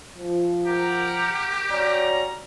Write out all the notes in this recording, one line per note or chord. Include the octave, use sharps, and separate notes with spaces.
F3
G4 A#4 F#5 A#5
G3 C#4 F#4 C#5 D5 A#5